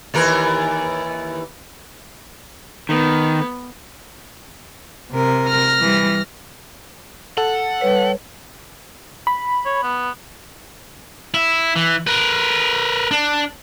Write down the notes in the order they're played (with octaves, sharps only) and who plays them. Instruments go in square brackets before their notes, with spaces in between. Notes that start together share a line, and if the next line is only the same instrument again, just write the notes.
[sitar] D#2 E3 A#4
[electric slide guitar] D#3 [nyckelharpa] B3
[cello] C3 A#4
[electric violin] F6 A#6
[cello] E3 G3
[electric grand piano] A4 [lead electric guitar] F#5
[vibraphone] G3 B4 [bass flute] C#5
[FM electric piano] B5
[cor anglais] C#5
B3
[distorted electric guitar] E4
E3
A#4 B4
D4